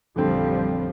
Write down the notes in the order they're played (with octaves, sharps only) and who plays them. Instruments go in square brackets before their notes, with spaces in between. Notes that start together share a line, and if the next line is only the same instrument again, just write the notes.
[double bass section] A1 F3 G3 [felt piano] F2 D3 C4